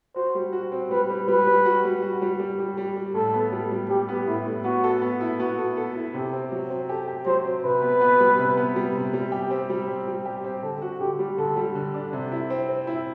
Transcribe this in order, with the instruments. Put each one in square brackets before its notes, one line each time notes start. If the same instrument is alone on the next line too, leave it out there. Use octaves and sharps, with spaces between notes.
[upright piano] F#4 [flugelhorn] C5
[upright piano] G3
F#4
C4
[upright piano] G3 [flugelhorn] B4
[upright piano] G3
[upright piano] G3 [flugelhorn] B4
[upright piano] G3
F#4
G3
F#4
G3
G3
G3
G3
G3
[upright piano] A2 [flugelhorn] A4
[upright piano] B3
G3
G3
[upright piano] G3 [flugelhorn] G4
[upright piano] B3
[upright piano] A2 [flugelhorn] E4
[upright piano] A2
[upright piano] B3 [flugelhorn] F#4
[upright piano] A4
B3
E4
[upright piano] B3 [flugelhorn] F#4
[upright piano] A4
A4
E4
[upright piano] C3 [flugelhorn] G4
[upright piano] C4
F#3
C4
[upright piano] G4 [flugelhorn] A4
[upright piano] G4
[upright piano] F#3 [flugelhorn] C5
[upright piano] C4
[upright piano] C3 [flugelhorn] B4
[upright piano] B3
B3
G3
C3
B3
G3
C3
G3
G4
C4
G3
C4
G3
G4
C4
[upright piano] D3 [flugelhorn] A4
[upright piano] F#4
[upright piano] D3 [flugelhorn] G4
[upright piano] G3
[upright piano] D3 [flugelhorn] A4
[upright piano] G3
D3
D4
C3
E4
C4
C4
E4